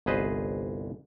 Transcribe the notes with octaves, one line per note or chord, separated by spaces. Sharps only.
G1 C2 G#4 B4 C5 D#5